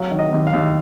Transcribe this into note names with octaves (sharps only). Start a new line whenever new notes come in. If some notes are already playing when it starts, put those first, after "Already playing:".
Already playing: F#3 F5
D#3
D#5
D#2
F5
D#2